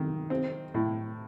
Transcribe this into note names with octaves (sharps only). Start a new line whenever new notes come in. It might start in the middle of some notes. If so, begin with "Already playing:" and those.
Already playing: D#3
C4
A2